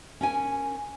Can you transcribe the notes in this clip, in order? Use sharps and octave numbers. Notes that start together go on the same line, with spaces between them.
C#4 A#4 G#5